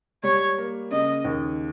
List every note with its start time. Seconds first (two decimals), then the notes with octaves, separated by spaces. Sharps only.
0.23 G3 C#5
0.58 A#3
0.91 C#3 D#5
1.25 D#2